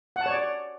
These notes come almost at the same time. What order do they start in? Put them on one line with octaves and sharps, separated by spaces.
F#5 A5 C#5 D5